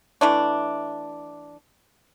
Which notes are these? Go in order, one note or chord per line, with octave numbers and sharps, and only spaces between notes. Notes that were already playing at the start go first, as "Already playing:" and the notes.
E3 A3 D4